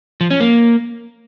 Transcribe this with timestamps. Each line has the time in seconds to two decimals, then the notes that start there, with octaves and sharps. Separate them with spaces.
0.21 F3
0.31 C#4
0.40 A#3